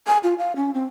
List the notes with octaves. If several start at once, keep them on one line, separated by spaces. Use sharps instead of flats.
G#5
F4
F5
C#4
C4